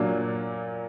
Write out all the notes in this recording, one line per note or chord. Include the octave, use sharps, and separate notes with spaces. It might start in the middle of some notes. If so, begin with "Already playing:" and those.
Already playing: A#2 F#3 A#3 D4